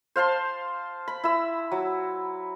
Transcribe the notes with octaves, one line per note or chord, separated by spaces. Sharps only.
C5 F5 A5 C6
B5
E4 E6
F#3